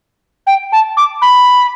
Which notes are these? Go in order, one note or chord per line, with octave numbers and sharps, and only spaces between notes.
G5
A5
D6
B5